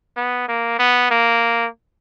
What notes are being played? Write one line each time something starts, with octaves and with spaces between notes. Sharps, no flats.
B3
A#3
B3
A#3